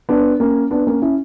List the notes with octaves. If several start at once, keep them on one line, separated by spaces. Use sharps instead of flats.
B3 D4
A#3 C#4
B3 D4
A#3 C#4
C#4 E4